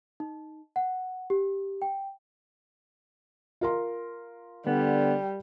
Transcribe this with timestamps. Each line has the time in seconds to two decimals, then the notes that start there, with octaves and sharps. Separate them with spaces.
0.20 D#4
0.76 F#5
1.30 G4
1.82 G5
3.61 F4 A#4 C6
4.67 D3 G3 B3